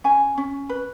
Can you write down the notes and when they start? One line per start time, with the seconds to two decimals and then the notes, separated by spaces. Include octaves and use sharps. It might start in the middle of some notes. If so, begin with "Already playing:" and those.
0.04 C#4 G#5
0.38 C#4
0.69 B4